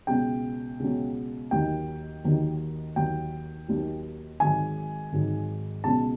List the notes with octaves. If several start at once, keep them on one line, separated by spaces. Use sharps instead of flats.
C#2 B2 F#3 G5
C#2 B2 F#3
D#2 D#3 F#3 G5
D#2 D#3 F#3
D#2 D#3 F#3 G5
D#2 D#3 F#3
G#1 G#2 D#3 F#3 G#5
G#1 G#2 D#3 F#3
C#2 B2 F#3 A5